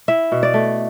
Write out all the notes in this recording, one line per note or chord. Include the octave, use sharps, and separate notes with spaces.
E4 E5
B2
D5
A3